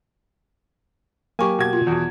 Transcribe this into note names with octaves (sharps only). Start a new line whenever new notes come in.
F#3 A#3 G4 G#5 C#6
B2 G#6
F4
E2 B2